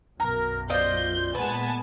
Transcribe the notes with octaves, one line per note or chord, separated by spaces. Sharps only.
B1 F#2 A#4
F4 C5 D5 D#5 G6
A#2 G#3 B3 B4 G#5 A5